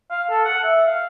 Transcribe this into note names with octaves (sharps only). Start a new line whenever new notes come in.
F5
A4
F#5
E5
F5